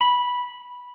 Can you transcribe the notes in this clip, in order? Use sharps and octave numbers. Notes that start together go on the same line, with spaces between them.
B5